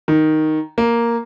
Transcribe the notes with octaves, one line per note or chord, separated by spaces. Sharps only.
D#3
A#3